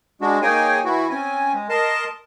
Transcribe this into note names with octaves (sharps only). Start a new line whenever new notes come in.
G#3 D4 F#4
A#3 D#4 G#4 C#5 G5 G#5
E3 E4 F#4
C4 C#4 G#5
G#3
A#4 D#5 A5 C6